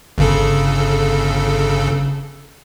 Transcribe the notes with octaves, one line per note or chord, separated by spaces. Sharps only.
G1 C#3 A4